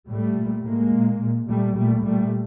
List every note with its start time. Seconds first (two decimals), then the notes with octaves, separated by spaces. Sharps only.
0.09 A2 G3 A3
0.37 A#2
0.64 A2 G#3 A#3
0.94 A#2
1.21 A#2
1.49 A#2 G3 A3
1.77 A#2 G3 A3
2.05 A#2 G3 A3